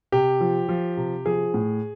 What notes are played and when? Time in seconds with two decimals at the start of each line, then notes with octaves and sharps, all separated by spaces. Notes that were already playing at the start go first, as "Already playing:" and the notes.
0.12 C3 G4
0.40 F3
0.69 F3
0.97 C3
1.26 F3 G#4
1.54 A2